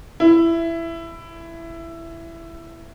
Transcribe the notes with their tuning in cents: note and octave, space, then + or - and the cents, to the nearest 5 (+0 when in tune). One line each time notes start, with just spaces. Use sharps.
E4 +15